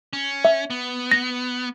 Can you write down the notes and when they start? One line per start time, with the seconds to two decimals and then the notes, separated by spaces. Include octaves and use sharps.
0.13 C#4
0.45 E5
0.70 B3
1.12 A#6